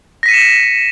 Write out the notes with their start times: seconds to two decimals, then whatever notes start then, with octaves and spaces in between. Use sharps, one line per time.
0.23 A#6
0.26 B6
0.28 D#7
0.31 C#7
0.34 E7